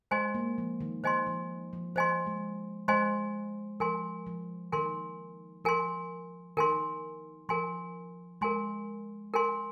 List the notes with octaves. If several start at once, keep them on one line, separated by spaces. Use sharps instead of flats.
G#3 C5 D#5 G#5 C6
A#3
F3
D#3
D#3 C5 D#5 G#5 C6
F3
F3
F3 C5 D#5 G#5 C6
G#3
G#3 C5 D#5 G#5 C6
F3 A#4 G#5 C6
F3
D#3 A#4 G#5 C6
F3 A#4 G#5 C6
D#3 A#4 G#5 C6
F3 A#4 G#5 C6
G#3 A#4 G#5 C6
A#4 G#5 C6